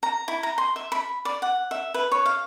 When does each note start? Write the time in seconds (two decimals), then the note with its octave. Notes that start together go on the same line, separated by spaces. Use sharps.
0.03 A#5
0.28 E4
0.43 A#5
0.58 C6
0.76 E5
0.92 B5
1.25 D5
1.42 F#5
1.71 E5
1.94 B4
2.12 C#5
2.26 F5